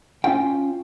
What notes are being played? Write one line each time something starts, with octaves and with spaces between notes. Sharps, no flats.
C#4 F4 F5 G5